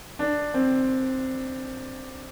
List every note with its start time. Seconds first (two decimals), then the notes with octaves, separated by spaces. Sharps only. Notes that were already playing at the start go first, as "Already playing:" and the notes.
0.19 D4
0.54 C4